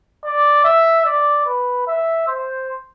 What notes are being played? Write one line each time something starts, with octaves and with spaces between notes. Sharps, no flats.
D5
E5
D5
B4
E5
C5